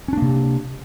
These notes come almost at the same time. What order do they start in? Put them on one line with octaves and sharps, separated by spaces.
C#4 D4 A#3 C3